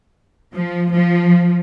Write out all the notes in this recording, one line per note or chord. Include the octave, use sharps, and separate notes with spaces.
F3
F3